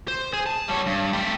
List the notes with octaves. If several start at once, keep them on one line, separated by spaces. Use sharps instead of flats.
C5
G#4
A5
G3 C#5
G2
A3 G4